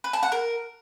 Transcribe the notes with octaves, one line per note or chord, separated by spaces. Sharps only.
B4
A5
F#5
A#4